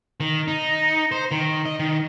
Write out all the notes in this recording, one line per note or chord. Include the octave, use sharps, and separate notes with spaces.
D#3
D#4
C5
D#3
D#5
D#3